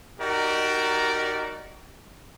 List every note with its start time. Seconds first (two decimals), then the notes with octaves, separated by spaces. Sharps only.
0.20 D#4 F#4 G4 A#4 D5